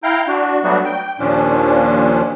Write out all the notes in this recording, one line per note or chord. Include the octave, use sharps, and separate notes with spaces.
E4 F5 G5 A#5 F6 G6
D4 F#4
F#3 G3 A3 B3 D4 F#4
G5
D#2 A#2 F3 C#4 D4